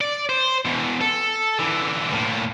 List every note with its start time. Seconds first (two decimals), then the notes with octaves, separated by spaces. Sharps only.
0.01 D5
0.29 C5
0.65 B2 E3
1.01 A4
1.59 D3 E3
2.12 A2 A#3